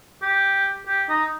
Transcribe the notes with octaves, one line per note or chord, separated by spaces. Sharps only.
G4
G4
D#4